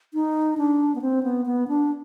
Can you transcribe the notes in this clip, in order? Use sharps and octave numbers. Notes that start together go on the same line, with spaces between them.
D#4
D4
B3
C4
B3
B3
D4